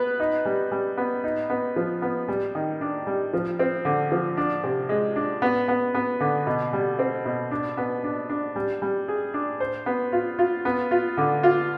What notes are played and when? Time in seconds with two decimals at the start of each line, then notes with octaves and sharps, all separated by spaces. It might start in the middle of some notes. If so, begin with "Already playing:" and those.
Already playing: B3 B4
0.20 D#4
0.45 G3
0.71 G3
0.97 B3
1.24 D#4
1.50 B3
1.76 F3
2.02 B3
2.28 G3
2.55 D#3
2.81 D4
3.07 G3
3.33 F3
3.59 C4
3.85 D3
4.12 F3
4.37 D4
4.64 C3
4.89 G#3
5.16 D4
5.42 B3
5.68 B3
5.94 B3
6.20 D3
6.47 B2
6.73 G3
6.99 C4
7.25 B2
7.51 D4
7.77 B3
8.04 D4
8.29 D4
8.56 G3
8.82 G3
9.08 G#4
9.34 D4
9.60 C5
9.86 B3
10.12 F4
10.39 F4
10.65 B3
10.91 F4
11.17 D3
11.43 F4